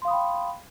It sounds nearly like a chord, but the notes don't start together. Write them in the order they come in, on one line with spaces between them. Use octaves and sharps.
C6 F5 D#6 B5 G5